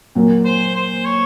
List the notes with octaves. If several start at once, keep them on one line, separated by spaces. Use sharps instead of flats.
A#2 F#3 A#3
C5
C5
C#5